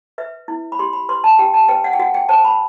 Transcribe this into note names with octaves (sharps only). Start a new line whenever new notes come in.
B4 E5
E4
B5
G4 C6
B5
B4 C6
A5
G4 G5
A5
B4 G5
F#5
G5
F#4 F#5
G5
C5 A5
B5